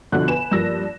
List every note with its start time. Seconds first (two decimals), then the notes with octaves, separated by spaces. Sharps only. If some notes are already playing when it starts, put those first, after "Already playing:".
0.12 G1 B2 D3 F3 F#4 F#6
0.28 B4 G#5 E7
0.51 G2 F3 A#3 E6 A#6